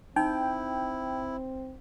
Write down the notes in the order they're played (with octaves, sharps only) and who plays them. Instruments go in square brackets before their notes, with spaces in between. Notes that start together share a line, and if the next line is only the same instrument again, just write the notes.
[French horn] C4 [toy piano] D#4 [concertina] E4 [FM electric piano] G5